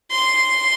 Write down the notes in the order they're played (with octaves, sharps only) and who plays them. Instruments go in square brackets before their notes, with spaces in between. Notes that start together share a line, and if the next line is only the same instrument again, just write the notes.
[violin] C6